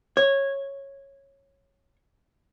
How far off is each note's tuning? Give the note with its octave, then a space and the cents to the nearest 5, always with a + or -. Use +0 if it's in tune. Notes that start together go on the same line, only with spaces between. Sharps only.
C#5 -10